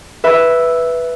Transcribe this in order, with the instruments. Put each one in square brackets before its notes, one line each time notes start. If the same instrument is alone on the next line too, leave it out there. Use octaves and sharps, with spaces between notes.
[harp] B4 E5